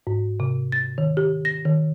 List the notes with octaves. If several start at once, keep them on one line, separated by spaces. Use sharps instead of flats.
G#2
C3
A6
D#3
G4
A#6
D#3